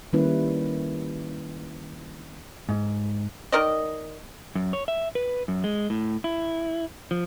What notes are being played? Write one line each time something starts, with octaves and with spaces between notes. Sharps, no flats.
D#3 G3 A#3 C#4 E4 B4
G#2
D#3 A#4 D5 D#5
F#2
C#5
E5
B4
F#2
G#3
A2
E4
F3